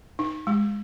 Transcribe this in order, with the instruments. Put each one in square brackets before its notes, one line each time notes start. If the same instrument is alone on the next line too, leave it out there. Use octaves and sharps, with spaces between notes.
[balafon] D#4
G#3